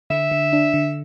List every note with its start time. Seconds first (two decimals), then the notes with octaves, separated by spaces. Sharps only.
0.10 D3 E5
0.31 D3
0.53 D4
0.74 D3